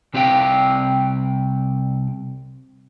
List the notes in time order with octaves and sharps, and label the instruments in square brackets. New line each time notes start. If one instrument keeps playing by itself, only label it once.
[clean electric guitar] C2 C4 G4 F5 G5